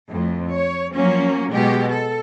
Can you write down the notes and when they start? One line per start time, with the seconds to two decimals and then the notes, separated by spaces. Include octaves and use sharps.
0.10 F2 A2
0.54 C#5
0.94 F3 F#3 A#3 C#4
1.51 B2 G#3 G4
1.91 A4